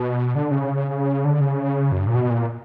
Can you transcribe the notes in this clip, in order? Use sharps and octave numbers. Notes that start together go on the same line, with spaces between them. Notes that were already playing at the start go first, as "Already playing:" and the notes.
Already playing: B2
D3
C#3
D3
C#3
F#2
G2
A#2
B2
A#2